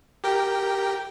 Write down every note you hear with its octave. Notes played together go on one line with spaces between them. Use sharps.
G4 A#4 G5